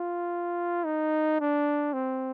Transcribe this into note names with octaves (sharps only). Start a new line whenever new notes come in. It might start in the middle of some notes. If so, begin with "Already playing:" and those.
Already playing: F4
D#4
D4
C4